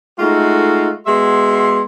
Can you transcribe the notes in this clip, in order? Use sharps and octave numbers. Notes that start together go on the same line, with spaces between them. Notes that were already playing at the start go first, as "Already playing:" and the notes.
G#3 A3 D#4 F4 F#4 A4
G#3 B3 F#4 E5 C6